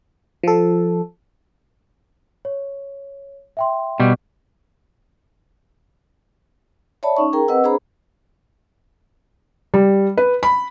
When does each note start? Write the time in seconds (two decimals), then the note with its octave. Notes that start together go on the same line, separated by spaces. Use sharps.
0.43 F3 A4
2.45 C#5
3.57 E5 G5 C6
4.00 B2 G3
7.03 C#5 D5 E5 A5 B5
7.17 C#4 D#4 C#6
7.33 G#4 A#4 G5 A#5
7.48 C4 B4 D#5 F#5 E6
7.64 D4 G#4 C5 A#5 B5
9.74 G3
10.17 B4
10.43 B5